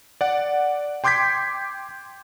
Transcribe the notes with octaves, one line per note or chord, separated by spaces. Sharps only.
D5 F#5
G5 C6 D6 G6 G#6 B6